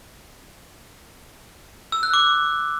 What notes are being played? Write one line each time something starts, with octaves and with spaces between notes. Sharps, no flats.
E6
F#6
D6